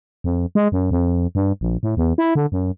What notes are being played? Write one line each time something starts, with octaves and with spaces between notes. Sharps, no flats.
F2
G#3
F#2
F2
G2
A#1
A2
E2
E4
D3
F#2